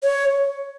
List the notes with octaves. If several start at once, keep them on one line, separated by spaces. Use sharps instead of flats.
C#5